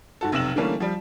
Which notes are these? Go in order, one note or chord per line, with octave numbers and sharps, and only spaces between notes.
G#2 F#4 A4
F1 B1 C3 E6 E7 F#7
D3 E3 G3 A3 A#3 C#4
F3 G3